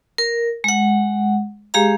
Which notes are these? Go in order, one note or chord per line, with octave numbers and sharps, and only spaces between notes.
A#4
G#3 F#5
G#3 G4 G#4 F5 A#5